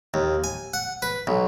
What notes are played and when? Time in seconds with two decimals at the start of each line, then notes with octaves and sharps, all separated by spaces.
0.14 D#2
0.44 G#5
0.74 F#5
1.02 B4
1.27 B1